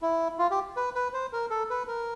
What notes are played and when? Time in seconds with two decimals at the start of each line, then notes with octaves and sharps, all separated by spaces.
0.02 E4
0.39 F4
0.51 G4
0.76 B4
0.95 B4
1.13 C5
1.33 A#4
1.50 A4
1.70 B4
1.88 A#4